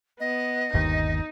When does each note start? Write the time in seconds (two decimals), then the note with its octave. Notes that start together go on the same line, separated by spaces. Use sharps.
0.20 B3 D#5
0.74 G1 D#2 D#4